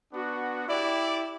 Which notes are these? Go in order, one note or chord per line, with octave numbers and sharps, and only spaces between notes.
B3 D4 F#4
E4 G4 D5